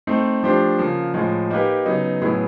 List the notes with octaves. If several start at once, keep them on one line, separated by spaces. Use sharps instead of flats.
A3 C4 D#4
F3 A3 D4 G4 C5
C#3 F3 A#3
A2 F3 G#3
A#3 D#4 G4 B4
C#3 F#3 B3 D#4
A2 F#3 B3 E4 G#4